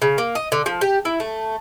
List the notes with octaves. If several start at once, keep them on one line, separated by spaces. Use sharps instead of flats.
C#3
A#3
D#5
D3
F3
G4
E4
A3